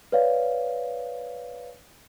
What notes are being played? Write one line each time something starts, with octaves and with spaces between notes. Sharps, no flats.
B4 C#5 D5 F5